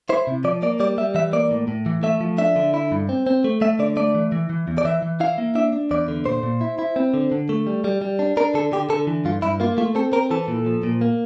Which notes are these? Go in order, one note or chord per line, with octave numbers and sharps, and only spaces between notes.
E4 C5
C3
F3 D5
A#3 D5
G3 D5
G3 E5
E3 E5
A#3 D5
A2
A2
E3
A3 E5
F3
D4 E5
D3
E4
G2
C4
C4
A3
A3 E5
D3 D5
A3 D5
E3
E3
E3
E2
D5
E3 E5
E3
E4 F5
A#3
D4 E5
D4
E2 D5
D3
A#2 C5
A#2
E4
E4
C4
D3
D3
A3
G3
G3
G3
D4
D4 A#4
D3 A4
D3 G4
D3 A4
E3
G2 F4
G2 E4
A#3 F4
A3 F4
C4 A4
C4 A#4
E3 A4
A#2
F3
A#2
A#3